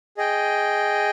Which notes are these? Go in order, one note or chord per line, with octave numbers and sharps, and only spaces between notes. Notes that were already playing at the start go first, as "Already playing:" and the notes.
G#4 D#5 G5